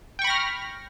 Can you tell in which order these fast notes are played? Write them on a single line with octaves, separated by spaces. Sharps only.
G5 C#6 B5 A#6 F6